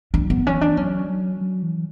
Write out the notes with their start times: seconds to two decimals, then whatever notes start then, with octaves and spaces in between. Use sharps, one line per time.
0.14 E3 D4
0.25 F#3
0.30 E3 B3
0.46 E3 C#4
0.61 D4
0.77 F#3 C#4
1.09 F#3
1.41 F#3
1.63 E3